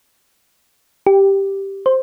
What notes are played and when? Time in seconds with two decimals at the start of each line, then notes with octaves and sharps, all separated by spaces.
1.07 G4
1.86 C5